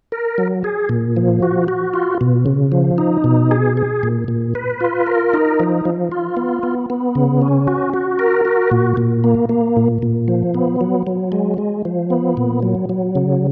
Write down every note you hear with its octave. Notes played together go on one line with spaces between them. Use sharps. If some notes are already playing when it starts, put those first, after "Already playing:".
A#4
F#3
G#4
A#2
F3
F#4
F#4
F4
B2
C#3
F3
D#4
B2
G#4
G#4
A#2
A#2
B4
F4
A#4
D#4
F3
F3
F4
B3
B3
B3
C#3
C#4
F#4
F#4
A#4
F#4
A#2
A#2
A#3
A#3
A#2
A#2
F3
B3
F#3
F#3
G#3
G#3
F3
B3
A#2
F#3
F#3
C#3